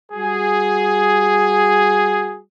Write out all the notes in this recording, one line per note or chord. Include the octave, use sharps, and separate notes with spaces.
G3 F#4 G#4